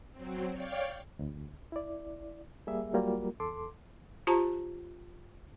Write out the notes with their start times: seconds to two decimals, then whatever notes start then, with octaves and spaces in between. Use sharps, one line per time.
0.12 F#3 C4
0.51 C#5 D5 F5 G5
1.19 D2
1.72 E4 D5
2.67 G3 A#3 G#4 E5
2.93 F#3 G3 A#3 F4 F#4 A#4
3.40 E2 A4 C6 D6
4.27 F4 G4 C5 A5 A#5